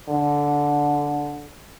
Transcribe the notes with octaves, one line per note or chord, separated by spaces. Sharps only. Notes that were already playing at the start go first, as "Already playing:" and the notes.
D3